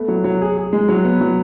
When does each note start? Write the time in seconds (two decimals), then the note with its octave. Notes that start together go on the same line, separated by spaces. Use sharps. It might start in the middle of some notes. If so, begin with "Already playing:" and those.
Already playing: A3 B3
0.08 F#3
0.24 F#3
0.41 G#4
0.58 G#4
0.73 G#3
0.89 F#3
1.05 B3
1.21 F#3